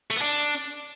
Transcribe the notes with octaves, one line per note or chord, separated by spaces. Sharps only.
A3
B3
D4